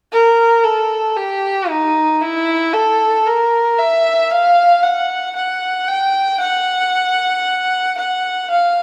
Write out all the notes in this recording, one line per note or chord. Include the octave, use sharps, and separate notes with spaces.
A#4
A4
G4
D#4
E4
A4
A#4
E5
F5
F#5
F#5
G5
F#5
F#5
F5